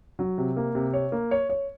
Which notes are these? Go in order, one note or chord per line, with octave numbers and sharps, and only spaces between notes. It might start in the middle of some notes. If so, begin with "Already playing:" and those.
F#3
C3
A#3
C3
C#5
A#3
C#5
C#5